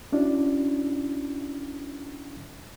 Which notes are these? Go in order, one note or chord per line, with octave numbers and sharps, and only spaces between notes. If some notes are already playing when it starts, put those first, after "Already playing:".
C#4 D4 E4 F#4 D5